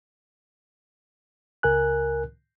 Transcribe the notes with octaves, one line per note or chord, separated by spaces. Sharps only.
C#2 A#4 G#5 F#6